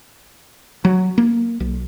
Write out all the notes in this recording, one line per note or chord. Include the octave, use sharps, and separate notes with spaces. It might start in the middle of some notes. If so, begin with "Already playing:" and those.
F#3
A#3
B1